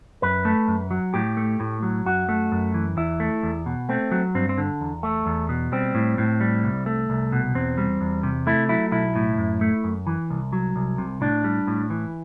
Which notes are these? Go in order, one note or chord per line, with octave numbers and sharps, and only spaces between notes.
F#2 B4
A3
F#2
F#3
A2 G4
A3
A2
F#3
F#2 F#4
A3
F#2
E3
E2 E4
A3
E2
B2
A3 C4
F#3
G2 C4
C4
D3
E2
A3
E2
B2
G3 C4
A2
A2
G3
C2
A3
C2
B2
E2 C4
G3
E2
C3
A3 E4
F#3 E4
B1 E4
A2
F#2
A3
F#2
E3
C2
F#3
C2
C3
A2 D4
G3
A2
E3